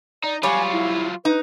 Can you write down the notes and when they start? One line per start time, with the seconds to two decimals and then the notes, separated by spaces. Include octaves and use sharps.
0.24 D#4 D5
0.43 F#3 G3 F4 C#5 G#5
0.72 E4
1.25 D#4 B4